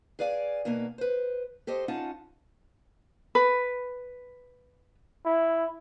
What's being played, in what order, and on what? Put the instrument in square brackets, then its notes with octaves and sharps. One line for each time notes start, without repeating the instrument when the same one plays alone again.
[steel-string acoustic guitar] G#4 B4 D5 F5 G#5
B2 A#3 B3 D#4 D#5 G#5
B4 C5
G4 A4 C5 D#5
C#4 D#4 F4 F#5 A5
[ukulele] B4
[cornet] E4